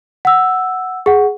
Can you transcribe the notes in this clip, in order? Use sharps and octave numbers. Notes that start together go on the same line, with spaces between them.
F#5 E6
G#4 F#5